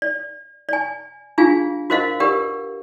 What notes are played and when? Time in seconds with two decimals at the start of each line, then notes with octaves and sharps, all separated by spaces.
0.02 D5
0.69 D5 G#5
1.38 D4 F4 G#4 F5 G#5
1.90 F#4 A#4 C5 D#5 F5 F#5
2.20 G4 A#4 B4 D5 F#5